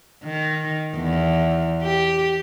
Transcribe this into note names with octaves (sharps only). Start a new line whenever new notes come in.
D#3
E2
G4